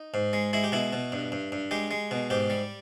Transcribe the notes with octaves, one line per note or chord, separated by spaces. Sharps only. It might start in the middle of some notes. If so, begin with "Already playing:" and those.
Already playing: D#4
G#2
G#3
G#3 E4
G4
B2 E4
B2
G2
G2
G2
G#3 G4
G#3
B2
G#2 G4
G3